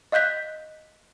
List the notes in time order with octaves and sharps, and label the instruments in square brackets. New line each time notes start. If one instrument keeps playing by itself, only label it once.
[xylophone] D#5 F5 F#6 G6 B6